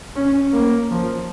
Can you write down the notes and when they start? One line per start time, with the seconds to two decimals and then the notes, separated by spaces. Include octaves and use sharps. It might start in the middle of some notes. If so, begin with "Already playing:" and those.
0.16 C#4
0.53 A#3
0.91 F3